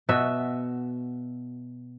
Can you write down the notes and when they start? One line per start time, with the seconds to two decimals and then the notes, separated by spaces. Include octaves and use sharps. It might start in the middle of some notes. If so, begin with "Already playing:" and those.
0.09 B2 F#4 B4 E5